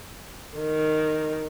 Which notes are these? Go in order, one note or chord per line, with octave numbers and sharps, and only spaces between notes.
D#3